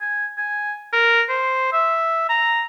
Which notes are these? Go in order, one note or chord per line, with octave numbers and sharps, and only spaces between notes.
G#5
G#5
A#4
C5
E5
A#5